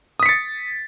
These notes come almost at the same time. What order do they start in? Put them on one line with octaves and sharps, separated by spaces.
D#6 B6 C#7 A6